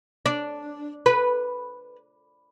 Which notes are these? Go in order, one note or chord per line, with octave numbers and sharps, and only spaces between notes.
D4
B4